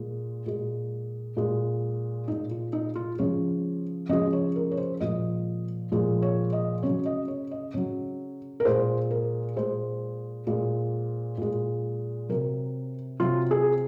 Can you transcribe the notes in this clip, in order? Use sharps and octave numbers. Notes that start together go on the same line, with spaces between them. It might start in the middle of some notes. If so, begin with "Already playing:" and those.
Already playing: A#2 G#3
A#2 G#3
A#2 G#3
A#2 G#3 D#4
F4
D#4
F4
C#3 F3 G#3 C#5
C#3 F3 G#3 D#5
C#5
A#4
C#5
C5
A#2 F3 G#3 D#5
A#2 F3 G#3
C#5
D#5
C#3 F#3 C#5
D#5
C#5
D#5
C#3 F#3 C#5
A#4
A#2 G#3 C5
A#4
A#2 G#3 C5
A#2 G#3
A#2 G#3
C3 F#3 A#4
C3 F#3 F4
G#4